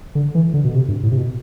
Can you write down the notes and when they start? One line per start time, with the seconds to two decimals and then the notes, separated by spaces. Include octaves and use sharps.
0.15 D3
0.35 E3
0.54 D3
0.64 B2
0.74 C3
0.88 G2
1.03 A2
1.11 C3
1.17 B2